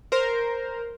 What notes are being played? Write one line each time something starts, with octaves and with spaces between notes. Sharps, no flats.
A#4 C5